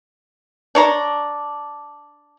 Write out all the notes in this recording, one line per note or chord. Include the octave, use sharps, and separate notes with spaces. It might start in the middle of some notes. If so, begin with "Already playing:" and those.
D4 C#5 A#5